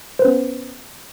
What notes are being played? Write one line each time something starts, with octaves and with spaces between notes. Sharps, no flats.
B3 C#4 B4 C5